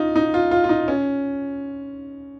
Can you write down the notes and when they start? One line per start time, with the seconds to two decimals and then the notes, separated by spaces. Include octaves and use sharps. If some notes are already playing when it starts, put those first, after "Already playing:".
Already playing: D#4 F4
0.16 D#4
0.34 F4
0.51 F4
0.64 F4
0.69 D#4
0.88 C#4